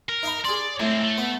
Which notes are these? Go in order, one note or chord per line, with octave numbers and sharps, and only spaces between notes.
A#4
D#4 F5 B5
G#4 D5 C6
A2 G#3 C4
A3
B3